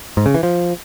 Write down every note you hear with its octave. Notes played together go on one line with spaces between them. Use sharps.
G#2
C#3
E3
F3